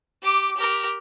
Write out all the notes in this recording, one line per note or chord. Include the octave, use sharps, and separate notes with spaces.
G4 D6
G4 A#4